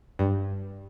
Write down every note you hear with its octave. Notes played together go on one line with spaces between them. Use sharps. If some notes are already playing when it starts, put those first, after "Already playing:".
G2